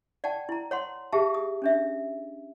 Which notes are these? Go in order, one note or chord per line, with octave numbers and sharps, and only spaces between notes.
D5 F#5 G5 A5
E4 A#5
C#5 F#5 C6
G4 G#4 E5 F5 A5
D#6
C#4 D4 E5